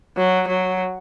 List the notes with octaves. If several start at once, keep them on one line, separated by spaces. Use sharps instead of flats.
F#3
F#3